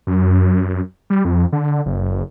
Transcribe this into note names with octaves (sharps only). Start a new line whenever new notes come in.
F#2
G3
F2
D3
F#1